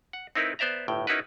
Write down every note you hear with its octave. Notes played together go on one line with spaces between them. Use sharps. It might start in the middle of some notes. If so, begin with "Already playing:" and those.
F#5
C4 D#4 E4 A#4 B4
B3 C5 D5 E5 A#5
G1 A2 G5
C#4 D#4 E4 F#4 A#4 B4